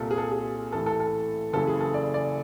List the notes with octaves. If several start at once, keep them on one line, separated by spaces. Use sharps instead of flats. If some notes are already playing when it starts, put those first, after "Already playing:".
Already playing: C2 A#2 A4
G#4
A4
G#4
A1 A2 E3 A4
A4
A4
F#1 F#2 C#3 E3 A4
G#4
A4
D5
D5